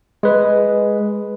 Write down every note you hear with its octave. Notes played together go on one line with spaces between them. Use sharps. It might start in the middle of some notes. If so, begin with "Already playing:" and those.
G#3 B4